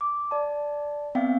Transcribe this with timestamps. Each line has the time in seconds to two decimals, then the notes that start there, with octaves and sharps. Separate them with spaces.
0.01 D6
0.31 D5 A5
1.15 B3 C4 E5 F5 G5